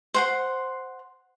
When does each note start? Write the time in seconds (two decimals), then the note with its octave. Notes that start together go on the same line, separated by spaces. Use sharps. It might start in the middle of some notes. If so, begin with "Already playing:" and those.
0.14 C5 F#5 C6